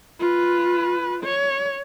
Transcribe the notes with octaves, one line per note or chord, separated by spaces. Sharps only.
F4 B4
C#5